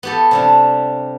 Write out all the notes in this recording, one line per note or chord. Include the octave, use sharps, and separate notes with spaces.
B3 G4 A4
C3 G3 D4